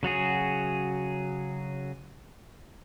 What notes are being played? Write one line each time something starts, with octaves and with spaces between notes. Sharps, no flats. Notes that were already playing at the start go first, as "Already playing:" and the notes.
C#3 F#3 F#4 G#4